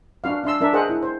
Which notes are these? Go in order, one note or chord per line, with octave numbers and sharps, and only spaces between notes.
D4 F#4 F5
D4 E5 C6 E6
D4 A#4 E5
G#4 A#4 C5 D#5 F#5
E4
C5